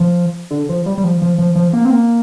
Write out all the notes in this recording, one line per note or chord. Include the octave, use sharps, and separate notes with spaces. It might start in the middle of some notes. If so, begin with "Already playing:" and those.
Already playing: F3
D3
F3
G3
G3
F3
F3
F3
F3
A#3
C4
A#3